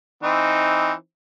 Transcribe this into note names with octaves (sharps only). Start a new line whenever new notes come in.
E3 C4 D#4